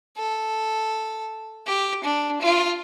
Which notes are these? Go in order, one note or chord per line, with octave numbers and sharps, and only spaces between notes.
A4
G4
D4
F4